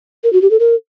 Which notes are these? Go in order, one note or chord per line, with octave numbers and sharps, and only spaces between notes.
A#4
F#4
G4
A4
A#4